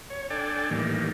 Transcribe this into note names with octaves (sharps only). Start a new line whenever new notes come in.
C#5
D4 A4 D5 G5 G#5
A2 D#3 E3 G3 A#3